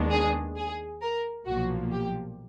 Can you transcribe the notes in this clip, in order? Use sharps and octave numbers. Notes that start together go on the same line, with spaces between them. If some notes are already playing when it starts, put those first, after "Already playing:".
Already playing: D#2 D#3 G#3 B3 D4
G#4
G#4
A#4
B1 A#2 F3 A#3 F#4
G4